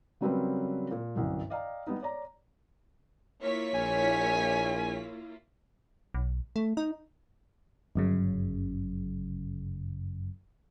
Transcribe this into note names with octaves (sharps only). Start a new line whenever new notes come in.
C#3 F#3 G3 C4 A#4 B4
A#2
G1 C2 F#2
D5 D#5 F5 G5 A#5
G3 B3 D#4
C#5 D5 A#5
A#3 E4 F4 C#5 B6
A#1 G#5
B1
A3
D#4
G1 F#2 C#3